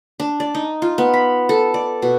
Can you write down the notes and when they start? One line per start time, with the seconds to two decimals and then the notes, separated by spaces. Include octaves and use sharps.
0.20 D4
0.40 D5
0.55 D#4
0.82 F4
0.98 B3
1.14 B5
1.49 A4
1.74 D5
2.02 B2